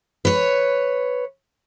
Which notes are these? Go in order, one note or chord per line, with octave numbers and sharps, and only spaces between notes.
B4 C#5